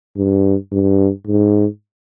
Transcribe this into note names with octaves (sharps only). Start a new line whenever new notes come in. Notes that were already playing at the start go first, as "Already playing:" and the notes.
G2
G2
G#2